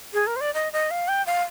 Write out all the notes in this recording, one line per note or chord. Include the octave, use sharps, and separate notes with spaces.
G#4
A#4
C5
D5
D#5
D#5
F5
G5
F5